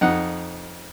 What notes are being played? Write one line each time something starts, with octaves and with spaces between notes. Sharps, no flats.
F2 D#4 F#5